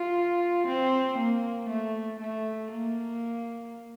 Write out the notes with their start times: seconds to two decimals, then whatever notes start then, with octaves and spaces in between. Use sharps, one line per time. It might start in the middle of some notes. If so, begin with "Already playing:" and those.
Already playing: F4
0.67 C4
1.18 A#3
1.69 A3
2.20 A3
2.71 A#3